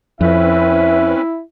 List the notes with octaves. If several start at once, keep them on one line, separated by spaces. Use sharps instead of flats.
F2 C4 C#4 E4 B4 E5